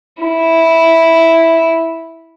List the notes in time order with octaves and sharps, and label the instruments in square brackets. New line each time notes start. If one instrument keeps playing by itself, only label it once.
[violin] E4